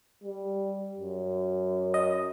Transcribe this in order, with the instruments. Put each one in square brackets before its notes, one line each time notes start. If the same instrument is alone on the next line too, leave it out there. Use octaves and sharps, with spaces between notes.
[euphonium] G3
F#2
[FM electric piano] D#5